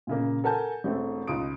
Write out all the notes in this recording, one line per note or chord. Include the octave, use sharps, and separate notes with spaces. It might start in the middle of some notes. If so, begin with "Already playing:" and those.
A#2 C#3 A#3
A4 A#4 F#5 G#5 A5 G6
E1 A3 C4
C#2 D#4 F4 D#6 D7